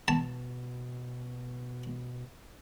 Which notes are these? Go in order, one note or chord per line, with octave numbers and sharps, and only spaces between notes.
B2 A5